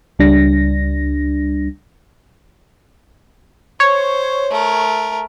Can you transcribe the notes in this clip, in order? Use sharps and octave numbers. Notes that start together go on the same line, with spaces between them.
C#2 G3 D4 A#6
C5 C#5
A3 A#4